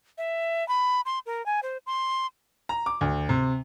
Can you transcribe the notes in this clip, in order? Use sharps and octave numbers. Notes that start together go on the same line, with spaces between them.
E5
B5
C6
A#4
G#5
C5
C6
A#5
D6
D2
C3